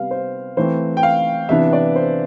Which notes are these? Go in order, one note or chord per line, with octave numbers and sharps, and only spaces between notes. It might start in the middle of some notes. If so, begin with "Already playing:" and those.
Already playing: C3 G3 B3 F5
C5
E3 A3 C4 C5
G5
F5
C3 E3 B3 D4 E5
D5
C5